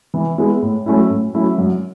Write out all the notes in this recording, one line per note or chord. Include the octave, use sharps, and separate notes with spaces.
E3
G#3 B3 E4
A2
F#3 A3 C#4 E4
A2
F#3 A3 C#4 E4
F#2